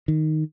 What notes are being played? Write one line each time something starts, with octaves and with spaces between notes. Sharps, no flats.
D#3